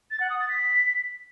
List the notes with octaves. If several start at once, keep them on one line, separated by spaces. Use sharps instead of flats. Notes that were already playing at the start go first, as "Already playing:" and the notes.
A6
F#5
D#6
A6
B6